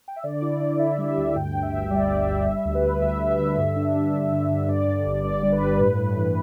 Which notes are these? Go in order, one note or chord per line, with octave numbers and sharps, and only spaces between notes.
G5
E5
D3 D5
E4
D5
E4
E4 E5
G3
E5
D2
G2 G5
G2
E5
G1
G3 D5
G1
E5
G1
G3 E5
D2
B4
D2
D2 E5
D2
E5
D3
G2
D4
D4
D3
D3
D3
G2 D5
G2
G1
G2 D5
G3
B4
G2
A2
A2
E3